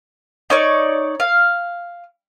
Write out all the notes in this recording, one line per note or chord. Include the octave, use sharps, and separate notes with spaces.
D#4 C#5 D5
F5